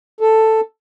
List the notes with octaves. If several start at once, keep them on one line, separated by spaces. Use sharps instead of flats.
A4